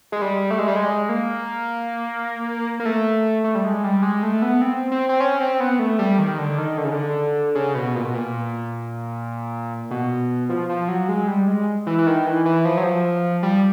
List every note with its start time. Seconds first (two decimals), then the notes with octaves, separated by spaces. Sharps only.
0.12 G#3
0.22 G3
0.51 A3
0.59 G#3
0.68 G3
0.76 G#3
1.09 A#3
2.80 A#3
2.85 A3
3.44 A3
3.55 G3
3.65 G#3
3.84 G3
4.03 G#3
4.23 A3
4.42 B3
4.61 C4
4.92 C4
5.09 C4
5.20 C#4
5.40 C4
5.60 B3
5.79 A3
5.99 G3
6.19 D#3
6.38 D3
6.58 D#3
6.78 D3
6.84 C#3
6.91 D3
7.55 C#3
7.75 B2
7.95 A#2
8.05 B2
8.14 A#2
9.91 B2
10.49 F3
10.69 F3
10.88 F#3
11.09 G#3
11.28 G3
11.48 G#3
11.87 E3
11.98 E3
12.07 D#3
12.26 E3
12.45 E3
12.65 F3
12.77 F#3
12.84 F3
13.43 G3